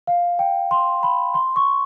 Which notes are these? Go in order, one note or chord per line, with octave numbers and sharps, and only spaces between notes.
F5
G5
C6
B5
C6
C#6